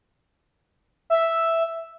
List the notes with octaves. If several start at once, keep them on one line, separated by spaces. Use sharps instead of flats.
E5